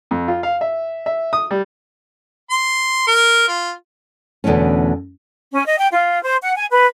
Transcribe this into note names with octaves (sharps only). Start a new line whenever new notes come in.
F2
F4
F5
E5
E5
D#6
G3
C6
A#4
F4
E2 B2 D3 A3 C#4
C#4
D#5
G5
F4
C5
F#5
G#5
B4